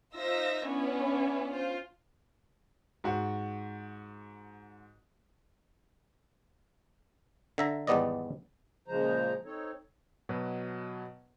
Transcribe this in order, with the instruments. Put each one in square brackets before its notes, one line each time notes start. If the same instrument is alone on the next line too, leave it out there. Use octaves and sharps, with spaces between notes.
[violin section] D#4 F4 C5 E5 E6 A#6
B3 C#4 D4 E4 B4 C#5
F4 C5
[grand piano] G#2 F#4
[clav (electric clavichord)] D3 E5 A#5
G#1 E2 G3 B3 D5 D#5
[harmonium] A#2 C#3 F3 G#3 C5 A#5
C4 D#4 A4 C#5
[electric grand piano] B2 F#3 B4